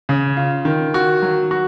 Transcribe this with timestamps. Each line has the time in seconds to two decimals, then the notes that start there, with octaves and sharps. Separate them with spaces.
0.09 C#3
0.37 F4
0.65 D#3
0.94 F#4
1.22 F#3
1.51 F#4